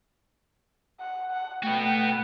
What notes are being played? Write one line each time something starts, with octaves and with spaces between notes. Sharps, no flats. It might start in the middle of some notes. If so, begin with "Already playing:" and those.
F#5
F#5
A3 B3 F#4 G5